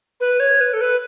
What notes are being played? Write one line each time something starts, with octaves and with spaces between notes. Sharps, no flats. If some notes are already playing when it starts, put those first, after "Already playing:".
B4
C#5
B4
A4
B4